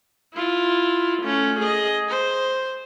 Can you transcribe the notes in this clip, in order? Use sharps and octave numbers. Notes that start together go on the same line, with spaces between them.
E4 F4
A3 C#4
G#4 D#5
C5